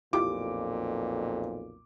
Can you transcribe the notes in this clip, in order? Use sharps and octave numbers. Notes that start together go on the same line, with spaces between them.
B1 F2 A#2 E4 F4 G4 D6